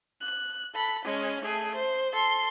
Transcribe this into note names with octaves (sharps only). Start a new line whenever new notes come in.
F#6
A4 B5
G#3 C#4
A3 G#4
C5
A4 C6